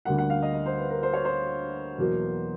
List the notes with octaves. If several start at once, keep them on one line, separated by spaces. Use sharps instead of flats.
D2 D3 G3 A#3 F#5
F#5
F5
D#5
D#5
C5
B4
A#4
C5
C#5
C5
E2 B2 F#3 A#3